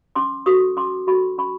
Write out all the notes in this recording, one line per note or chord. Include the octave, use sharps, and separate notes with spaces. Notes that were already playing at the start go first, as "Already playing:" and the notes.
C#4 C6 D6
F#4 A4 C#6 D#6
C#4 C6 D6
F#4 A4 B5 C#6
C#4 B5 C#6